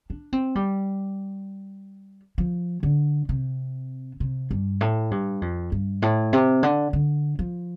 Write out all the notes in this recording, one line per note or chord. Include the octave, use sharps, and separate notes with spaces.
D4
C4
G3
F3
D3
C3
C3
G2
A2
G2
F2
G2
A2
C3
D3
D3
F3